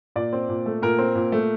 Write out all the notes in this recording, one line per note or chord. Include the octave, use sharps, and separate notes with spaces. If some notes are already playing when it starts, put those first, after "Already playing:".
A#2 D5
C4
A#2
A3
A#2 A#4
C4
A#2
A3